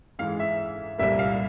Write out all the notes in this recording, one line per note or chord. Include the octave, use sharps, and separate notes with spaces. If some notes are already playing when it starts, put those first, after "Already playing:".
G#2 E3 G#3 F5
E5
C2 A#2 G3 A#3 E5
F5